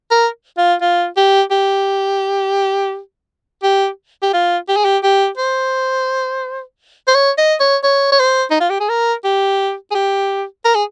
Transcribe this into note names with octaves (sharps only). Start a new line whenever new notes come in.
A#4
F4
F4
G4
G4
G4
G4
F4
G4
G#4
G4
G4
C5
C5
C#5
D#5
C#5
C#5
C#5
C5
D#4
F4
G4
G#4
A#4
G4
G#4
G4
A#4
G#4